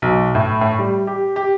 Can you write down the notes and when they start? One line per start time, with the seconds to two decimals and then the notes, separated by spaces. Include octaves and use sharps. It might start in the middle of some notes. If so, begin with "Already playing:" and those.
0.02 B1
0.35 A2
0.61 A2
0.78 G3
1.07 G4
1.36 G4